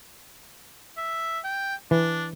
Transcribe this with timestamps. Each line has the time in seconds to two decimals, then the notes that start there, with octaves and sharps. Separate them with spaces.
0.97 E5
1.44 G5
1.91 E3 D4